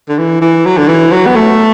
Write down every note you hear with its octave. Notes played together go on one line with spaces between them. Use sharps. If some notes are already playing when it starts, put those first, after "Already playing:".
D3
E3
E3
F#3
D3
E3
F#3
B3
A3